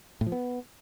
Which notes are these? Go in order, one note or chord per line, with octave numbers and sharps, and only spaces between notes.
A2
F3
B3